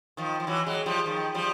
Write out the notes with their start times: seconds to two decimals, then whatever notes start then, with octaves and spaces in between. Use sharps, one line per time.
0.17 D#3 F3
0.40 F3
0.47 E3 F#3
0.66 F#3 G#3
0.86 F3 G3
1.06 D#3 F3
1.34 F3 G3